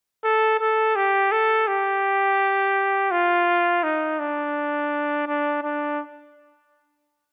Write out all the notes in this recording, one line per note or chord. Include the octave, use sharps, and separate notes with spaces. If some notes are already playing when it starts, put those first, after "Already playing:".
A4
A4
G4
A4
G4
F4
D#4
D4
D4
D4